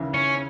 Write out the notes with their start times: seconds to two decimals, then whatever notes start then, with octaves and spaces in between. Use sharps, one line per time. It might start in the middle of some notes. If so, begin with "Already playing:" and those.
Already playing: D#2 C#3 E3
0.14 C#4